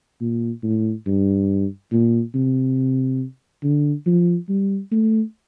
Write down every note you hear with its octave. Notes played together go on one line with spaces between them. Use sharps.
A#2
A2
G2
A#2
C3
D3
F3
G3
A3